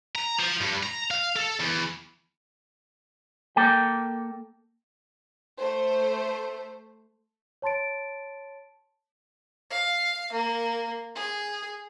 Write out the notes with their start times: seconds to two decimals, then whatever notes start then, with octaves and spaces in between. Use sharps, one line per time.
0.15 A#5
0.39 F3
0.61 G2
0.83 A#5
1.11 F5
1.36 A4
1.60 E2
3.56 A#3 A4 G5
5.59 A3 C5
7.62 C#5 A5 C6 A6 D7
9.70 F5
10.32 A#3
11.15 G#4